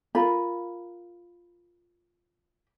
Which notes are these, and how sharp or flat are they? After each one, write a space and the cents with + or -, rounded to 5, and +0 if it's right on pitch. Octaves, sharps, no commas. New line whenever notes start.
F4 +0 A#4 +0 B5 +0